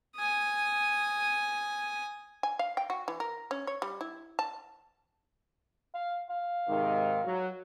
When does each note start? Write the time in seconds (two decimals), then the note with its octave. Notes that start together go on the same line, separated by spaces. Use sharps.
0.16 G#5 D#6
2.43 G#5
2.59 F5
2.77 G5
2.90 F#4
3.08 E3
3.20 A#4
3.51 C#4
3.67 C#5
3.82 G3
4.01 E4
4.39 A5
5.94 F5
6.30 F5
6.68 G#2 C3 D#3
7.24 F#3